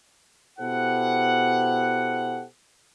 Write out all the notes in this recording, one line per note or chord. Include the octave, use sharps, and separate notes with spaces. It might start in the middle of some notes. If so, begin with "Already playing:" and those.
B2 E4 G4 A4 C5 F#5